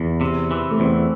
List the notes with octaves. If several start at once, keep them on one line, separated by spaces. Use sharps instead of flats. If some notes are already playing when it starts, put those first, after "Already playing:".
Already playing: E2
C3
E3
A3
E2 C4